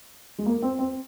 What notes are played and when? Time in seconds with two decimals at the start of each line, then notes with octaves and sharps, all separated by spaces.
0.38 G#3
0.46 A#3
0.62 C4
0.79 C4